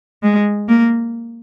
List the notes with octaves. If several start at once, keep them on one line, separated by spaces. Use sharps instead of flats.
G#3
A#3